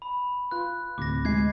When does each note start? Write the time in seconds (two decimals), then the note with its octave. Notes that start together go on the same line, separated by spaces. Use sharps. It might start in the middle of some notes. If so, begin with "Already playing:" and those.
0.02 B5
0.51 F4 B4 F#6
0.98 D2 A2 C3 D6 A#6
1.25 G#3 G#6 C7